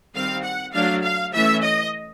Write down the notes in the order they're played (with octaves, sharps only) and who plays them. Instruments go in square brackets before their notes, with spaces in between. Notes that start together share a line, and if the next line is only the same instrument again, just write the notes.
[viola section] D#3 G3 C4 F5
F#5
F#3 A3 D4 F5
F5
E3 A3 C#4 E5
D#5